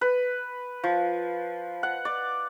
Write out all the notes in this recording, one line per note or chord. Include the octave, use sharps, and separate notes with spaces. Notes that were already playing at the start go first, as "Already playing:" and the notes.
B4
F3
F#5
D5